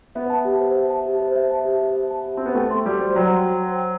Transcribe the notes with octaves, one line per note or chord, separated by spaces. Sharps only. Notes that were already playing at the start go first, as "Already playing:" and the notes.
B3 E5
A5
G4
C5
E5
A5
G4
C5
E5
A5
G4
C5
E5
A5
G4
C4 C5
B3
A3 G5
C6
G3 F#4
C5
F#3 G5
C6
F#4
C5
G5